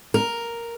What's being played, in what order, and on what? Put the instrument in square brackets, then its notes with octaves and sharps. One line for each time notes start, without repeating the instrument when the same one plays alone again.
[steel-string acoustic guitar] A#4